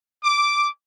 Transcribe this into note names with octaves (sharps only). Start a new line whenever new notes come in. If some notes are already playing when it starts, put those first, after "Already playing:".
D6